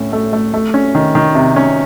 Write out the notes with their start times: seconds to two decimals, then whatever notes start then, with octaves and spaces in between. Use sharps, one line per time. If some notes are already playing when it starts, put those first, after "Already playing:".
Already playing: A2 A3 C#4
0.13 A3
0.33 A3
0.54 A3
0.74 C#4
0.95 D#3
1.15 D#3
1.35 C3
1.56 C#4